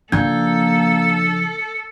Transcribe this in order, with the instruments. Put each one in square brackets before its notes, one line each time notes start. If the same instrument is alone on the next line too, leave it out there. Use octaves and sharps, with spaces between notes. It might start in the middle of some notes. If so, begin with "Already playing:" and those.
[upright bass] C#3 F3 [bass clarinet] A#3 [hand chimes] D4 G6 G#6 [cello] A4